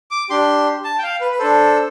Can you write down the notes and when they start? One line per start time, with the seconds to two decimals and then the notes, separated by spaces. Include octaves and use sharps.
0.11 D6
0.30 D4 G4 C6
0.84 A5
0.99 G5
1.03 F5
1.21 B4
1.32 B4
1.39 D4 A4 C5